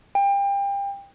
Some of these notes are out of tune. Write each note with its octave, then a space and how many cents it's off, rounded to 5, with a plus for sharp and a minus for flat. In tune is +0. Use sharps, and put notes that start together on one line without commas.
G5 +30